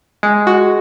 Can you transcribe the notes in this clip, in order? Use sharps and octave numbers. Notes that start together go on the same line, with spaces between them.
G#3
F#4